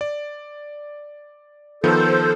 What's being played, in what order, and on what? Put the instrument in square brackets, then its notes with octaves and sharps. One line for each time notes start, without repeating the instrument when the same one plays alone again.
[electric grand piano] D5
[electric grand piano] D#3 F3 B3 [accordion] A4 C5